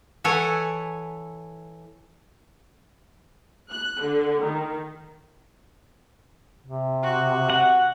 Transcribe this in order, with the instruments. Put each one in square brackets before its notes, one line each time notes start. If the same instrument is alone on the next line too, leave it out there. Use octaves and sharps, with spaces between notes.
[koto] E3 E4 A4 C#5 F#5 G#5
[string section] F#6
D3
D#3
[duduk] C3
[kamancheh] F#4
[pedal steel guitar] F#5